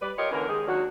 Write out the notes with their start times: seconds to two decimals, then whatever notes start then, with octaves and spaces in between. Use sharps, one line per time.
0.02 G3 B4 D5
0.18 F4 G4 A#4 C#5 D#5
0.31 D3 E3 A#3 C#4 A#4
0.49 D#3 G#3 D#4 G4 G#4 D#5
0.67 D#3 F#3 A#3 D4 F#4